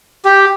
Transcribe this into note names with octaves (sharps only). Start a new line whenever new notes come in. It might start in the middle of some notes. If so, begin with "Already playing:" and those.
G4